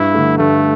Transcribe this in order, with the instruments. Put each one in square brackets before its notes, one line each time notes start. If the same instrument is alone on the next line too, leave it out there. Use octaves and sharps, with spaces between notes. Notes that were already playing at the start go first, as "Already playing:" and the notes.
Already playing: [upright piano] G2 [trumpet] E4
[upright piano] D3 A3
[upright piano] G2 [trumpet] A3